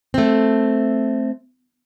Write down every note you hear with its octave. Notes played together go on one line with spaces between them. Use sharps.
A3 C4